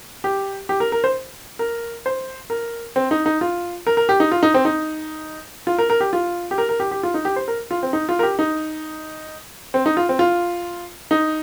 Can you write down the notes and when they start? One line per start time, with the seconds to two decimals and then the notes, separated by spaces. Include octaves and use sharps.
0.24 G4
0.69 G4
0.80 A#4
0.92 A#4
1.04 C5
1.59 A#4
2.06 C5
2.50 A#4
2.96 C4
3.11 D#4
3.26 D#4
3.41 F4
3.87 A#4
3.97 A#4
4.09 G4
4.20 D#4
4.32 F4
4.43 D#4
4.54 C4
4.65 D#4
5.67 F4
5.79 A#4
5.90 A#4
6.01 G4
6.13 F4
6.51 G4
6.58 A#4
6.69 A#4
6.80 G4
6.91 G4
7.03 F4
7.14 D#4
7.25 G4
7.36 C5
7.48 A#4
7.71 F4
7.83 C4
7.93 D#4
8.09 F4
8.19 A#4
8.23 G4
8.39 D#4
9.74 C4
9.86 D#4
9.97 F4
10.09 C4
10.19 F4
11.11 D#4